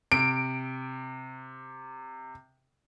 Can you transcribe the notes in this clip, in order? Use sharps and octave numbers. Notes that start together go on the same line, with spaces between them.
C3 D7